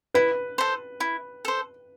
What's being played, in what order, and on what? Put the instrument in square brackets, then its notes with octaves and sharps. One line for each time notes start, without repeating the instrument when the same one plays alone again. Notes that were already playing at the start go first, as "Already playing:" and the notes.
[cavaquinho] E4 [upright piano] B4
[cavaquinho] A4 C5
E4
A4 C5